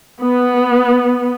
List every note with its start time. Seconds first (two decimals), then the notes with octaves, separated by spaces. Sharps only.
0.22 B3